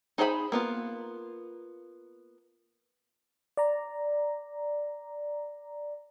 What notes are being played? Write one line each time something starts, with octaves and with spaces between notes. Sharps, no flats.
D#4 G#4 C5 F#5 B5
A#3 B3 F4
D5 A#5